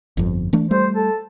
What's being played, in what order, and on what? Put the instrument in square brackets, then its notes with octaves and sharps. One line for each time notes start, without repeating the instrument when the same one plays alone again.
[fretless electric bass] G1 F2
E3 A3 D4
[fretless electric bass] G3 A3 [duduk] C5
[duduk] A4